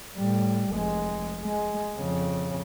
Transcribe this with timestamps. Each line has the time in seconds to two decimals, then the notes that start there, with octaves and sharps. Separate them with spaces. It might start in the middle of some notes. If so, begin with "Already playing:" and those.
0.17 A2 G3
0.73 F1 G#3
1.45 G#3
1.99 F2 C#3